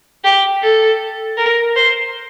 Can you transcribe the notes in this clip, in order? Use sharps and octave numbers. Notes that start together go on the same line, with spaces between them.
G4
A4
A#4
C5